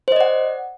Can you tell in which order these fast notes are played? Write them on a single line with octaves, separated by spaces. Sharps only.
C5 D#5 D5 F#5